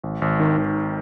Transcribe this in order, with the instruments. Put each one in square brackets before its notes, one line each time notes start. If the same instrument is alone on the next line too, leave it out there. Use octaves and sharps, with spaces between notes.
[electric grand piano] G#1
G#1
D#3
G#1